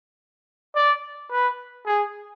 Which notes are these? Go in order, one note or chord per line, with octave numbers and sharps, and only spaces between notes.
D5
B4
G#4